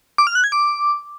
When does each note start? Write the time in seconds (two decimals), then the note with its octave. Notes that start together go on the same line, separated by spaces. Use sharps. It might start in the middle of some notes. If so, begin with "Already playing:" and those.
0.18 D6
0.27 F6
0.35 F#6
0.44 G#6
0.52 D6